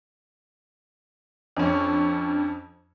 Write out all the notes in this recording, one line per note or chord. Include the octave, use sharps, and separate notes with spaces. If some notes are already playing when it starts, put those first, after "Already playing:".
F2 C#4 D4